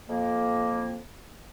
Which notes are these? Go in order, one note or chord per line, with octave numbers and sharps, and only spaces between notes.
F2 A#3